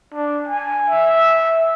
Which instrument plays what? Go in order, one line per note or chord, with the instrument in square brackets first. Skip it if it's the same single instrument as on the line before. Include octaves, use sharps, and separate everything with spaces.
[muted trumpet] D4
G#5
E5